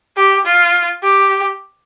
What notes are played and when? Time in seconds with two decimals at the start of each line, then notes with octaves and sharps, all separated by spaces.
0.17 G4
0.45 F4
1.03 G4